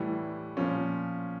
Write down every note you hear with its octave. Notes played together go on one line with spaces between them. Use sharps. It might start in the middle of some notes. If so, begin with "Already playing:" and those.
Already playing: A2 E3 G3
A#2 F3 C#4